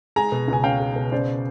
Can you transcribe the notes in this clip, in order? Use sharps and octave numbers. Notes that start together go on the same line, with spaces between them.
G#3 G#5 A#5
B2
C#2
G#5
C#4 F5 G5
G#3
B2
C#3 C5 D5